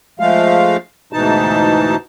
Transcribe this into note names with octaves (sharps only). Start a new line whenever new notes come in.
F3 G#3 A3 F5
D2 G#2 B2 E3 D#4 A5